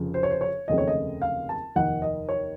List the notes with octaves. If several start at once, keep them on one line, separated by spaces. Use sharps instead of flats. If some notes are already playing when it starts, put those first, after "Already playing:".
Already playing: F1 F2 C#3 F3
C5
C#5
C5
C#5
F1 D#2 C#3 A3 C4 D#5
C#5
D#5
F5
A5
F1 D#2 D#3 F#5
D#5
C#5